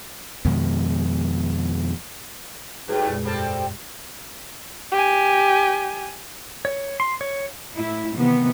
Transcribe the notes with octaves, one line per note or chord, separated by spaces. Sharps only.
F2 B2 D#3 G#3
G#2 G3 A3 F#4 G#4 B4
F2 A#2 G#3
G2 G3 C4 A4 A6
G4 G#5
C#5
C6
C#5
A2 E4
C3 D#3 E3 B3